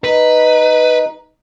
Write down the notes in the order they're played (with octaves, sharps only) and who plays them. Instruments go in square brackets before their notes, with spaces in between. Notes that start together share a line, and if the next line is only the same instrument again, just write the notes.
[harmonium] D#4 [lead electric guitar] B4